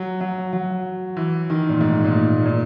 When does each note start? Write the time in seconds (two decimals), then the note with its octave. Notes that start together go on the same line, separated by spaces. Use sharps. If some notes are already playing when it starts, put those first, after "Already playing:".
Already playing: F#3
0.21 F#3
0.53 F#3
1.17 E3
1.50 D#3
1.69 A#2
1.81 G#2
2.04 A#2
2.13 G#2
2.46 A#2